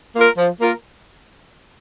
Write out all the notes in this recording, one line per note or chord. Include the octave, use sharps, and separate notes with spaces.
A#3 F4 A#4
F3
A#3 F4 A#4